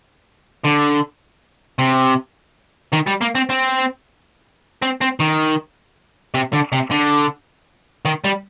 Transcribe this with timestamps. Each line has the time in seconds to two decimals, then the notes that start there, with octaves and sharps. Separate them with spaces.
0.64 D3
1.79 C3
2.93 D#3
3.07 G3
3.21 A#3
3.35 C4
3.50 C4
4.82 C4
5.01 C4
5.20 D#3
6.34 C3
6.53 D3
6.72 C3
6.91 D3
8.05 D#3
8.24 G3